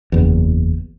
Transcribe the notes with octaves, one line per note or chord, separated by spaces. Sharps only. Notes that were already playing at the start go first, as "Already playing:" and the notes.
F#1 E2